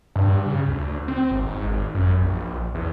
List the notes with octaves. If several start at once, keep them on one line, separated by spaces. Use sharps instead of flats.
G2
C#3
D2
C4
G#1
G#2
G#1
F#2
A#1
E2